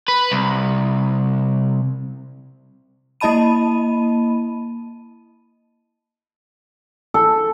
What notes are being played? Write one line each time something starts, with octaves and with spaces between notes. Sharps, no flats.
B4
C2
A#3 E4 D#5 A5 B5 D#7
A4